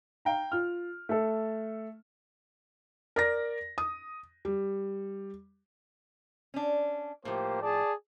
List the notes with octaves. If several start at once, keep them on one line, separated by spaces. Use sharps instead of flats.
F5 G5 A#5
F4 F6
A3 A4
A#4 D5 A#6
D#6
G3
C#4 D4
A2 F3 A#3 G4 C5
G#4 D5 A5